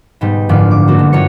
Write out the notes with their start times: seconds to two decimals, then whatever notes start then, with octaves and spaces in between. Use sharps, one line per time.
0.21 G#2 B2 G3 D#4
0.49 F#1 G#2 D3 F3 D5 D6
0.71 D6
0.88 F#3 A3 A#3 C4 F#4
0.99 B2
1.12 G1 F#3 C#5 C#7